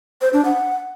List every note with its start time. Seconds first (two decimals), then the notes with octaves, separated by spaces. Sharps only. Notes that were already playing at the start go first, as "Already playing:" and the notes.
0.21 C5
0.33 D4
0.45 F#5